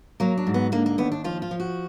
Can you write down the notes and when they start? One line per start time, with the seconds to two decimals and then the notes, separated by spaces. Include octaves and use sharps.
0.20 F#3 A#3
0.38 D4
0.47 G#2
0.54 B3
0.72 D3 A#3
0.86 A#3
0.98 D#2 B3
1.12 D4
1.24 F3 F4
1.42 F4
1.51 F3
1.60 F#4